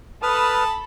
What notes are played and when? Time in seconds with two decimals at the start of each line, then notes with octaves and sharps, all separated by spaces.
0.23 A4 B4 A5 B5 D#6 F6